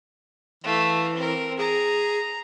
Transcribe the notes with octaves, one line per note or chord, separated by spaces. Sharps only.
E3 A3 F5
C4 A#4
G#4 A#5